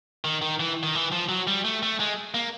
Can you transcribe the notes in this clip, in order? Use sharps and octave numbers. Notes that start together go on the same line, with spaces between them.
D#3
D#3
E3
D#3
E3
F3
F#3
G3
A3
A3
G#3
A#3